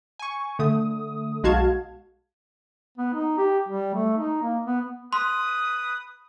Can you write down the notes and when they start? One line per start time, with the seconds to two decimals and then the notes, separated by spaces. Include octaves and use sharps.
0.19 G#5 C#6
0.59 D3 A3 D#6
1.43 B1 G#3 F#4 F5 A5 G#6
2.98 B3
3.14 D#4
3.38 G4
3.69 G3
3.94 A3
4.17 D#4
4.42 A#3
4.66 B3
5.13 B4 C6 D#6